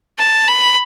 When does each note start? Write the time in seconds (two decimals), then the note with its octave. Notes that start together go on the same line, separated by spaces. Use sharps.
0.18 A5
0.48 B5